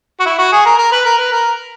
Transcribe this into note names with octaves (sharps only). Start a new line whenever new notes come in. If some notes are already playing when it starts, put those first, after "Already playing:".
F#4
E4
F#4
G#4
A#4
A#4
B4
A#4
B4
A#4